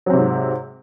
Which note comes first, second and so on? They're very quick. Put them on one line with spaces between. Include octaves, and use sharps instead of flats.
F#3 C4 C3 G#2